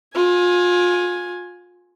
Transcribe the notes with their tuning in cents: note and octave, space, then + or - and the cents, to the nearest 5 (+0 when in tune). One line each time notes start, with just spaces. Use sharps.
F4 +30 G#5 +0